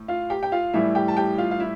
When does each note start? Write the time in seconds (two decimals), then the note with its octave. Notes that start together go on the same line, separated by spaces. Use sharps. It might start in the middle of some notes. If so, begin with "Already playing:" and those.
Already playing: A2
0.08 F4 F5
0.30 G4 G5
0.43 G5
0.52 F4 F5
0.74 A2 E3 G3 E4 E5
0.95 G4 G5
1.08 A5
1.17 G4 G5
1.38 F4 F5
1.51 F5
1.60 E4 E5